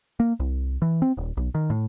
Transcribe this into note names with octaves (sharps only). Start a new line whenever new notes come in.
A#3
C2
E3
C4
D#1
B1
D#3
A2